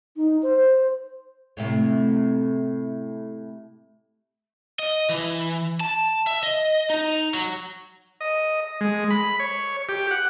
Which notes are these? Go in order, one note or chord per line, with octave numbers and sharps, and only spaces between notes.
D#4
C5
A2 C3 A3
D#5
E3
A5
E5
D#5
D#4
F#3
D#5
G#3
B5
C#5
G4
F#5